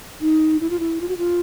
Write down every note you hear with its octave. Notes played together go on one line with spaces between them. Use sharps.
D#4
E4
F4
E4
F4
F#4
F4